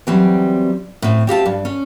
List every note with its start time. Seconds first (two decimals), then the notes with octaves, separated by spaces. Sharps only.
0.07 E3 F#3 G3 C4
1.02 A2 C4
1.27 C4 G4 F5 A5
1.46 G2
1.65 C#4